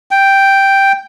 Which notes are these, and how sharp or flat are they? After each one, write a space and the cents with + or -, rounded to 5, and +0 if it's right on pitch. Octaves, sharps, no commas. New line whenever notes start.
G5 +0